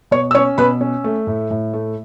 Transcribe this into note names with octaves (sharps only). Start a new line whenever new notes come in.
B2 C#5 C#6
E6
C#4 C#5 C#6
B2 B4 B5
C#4
A3
A2
A2
A3